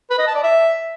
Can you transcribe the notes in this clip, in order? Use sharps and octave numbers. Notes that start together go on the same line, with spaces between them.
B4
D#5
A5
D5
E5